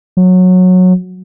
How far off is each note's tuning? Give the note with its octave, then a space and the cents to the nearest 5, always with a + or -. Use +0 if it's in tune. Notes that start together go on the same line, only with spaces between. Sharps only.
F#3 -15